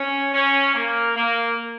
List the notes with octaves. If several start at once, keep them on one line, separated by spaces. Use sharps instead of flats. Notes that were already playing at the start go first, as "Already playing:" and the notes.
Already playing: C#4
C#4
A#3
A#3